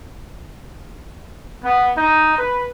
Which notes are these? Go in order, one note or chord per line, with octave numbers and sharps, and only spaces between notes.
B3
D#4
B4